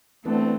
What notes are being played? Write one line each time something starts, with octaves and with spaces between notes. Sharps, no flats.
E3 A3 B3 C4 D4